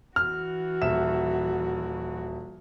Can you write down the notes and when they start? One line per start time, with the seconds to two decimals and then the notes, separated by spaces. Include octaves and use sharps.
0.16 E3 F#4 F6
0.81 D#1 E5 E7